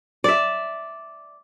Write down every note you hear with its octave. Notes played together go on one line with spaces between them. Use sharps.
D5 E5